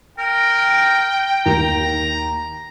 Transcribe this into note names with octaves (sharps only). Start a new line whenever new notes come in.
A#4 G5
D#2 A#5